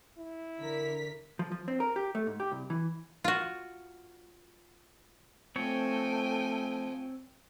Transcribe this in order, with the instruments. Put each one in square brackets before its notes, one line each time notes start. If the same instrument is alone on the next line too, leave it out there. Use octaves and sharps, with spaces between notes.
[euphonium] E4
[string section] D3 A#4 B6
[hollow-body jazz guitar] F3
F3
C4
A#4
G4
A3
G#2
G4
C2
E3
[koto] F4 F#4
[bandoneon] F3 [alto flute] A3 [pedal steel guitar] C4 C#5 [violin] G5 G#5